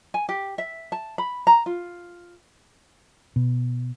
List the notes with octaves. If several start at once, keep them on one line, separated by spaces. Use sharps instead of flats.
G#5
G4
E5
A5
B5
A#5
F4
B2